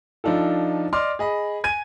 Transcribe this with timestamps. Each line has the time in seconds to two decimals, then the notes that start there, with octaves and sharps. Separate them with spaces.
0.24 F3 D4 D#4 F4 A4
0.93 D5 D#5 C6 D6 F6
1.19 G#4 D#5 B5
1.64 G#5 G#6 D#7